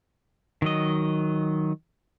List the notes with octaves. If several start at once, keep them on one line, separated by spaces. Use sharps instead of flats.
D#3 F#3 D#5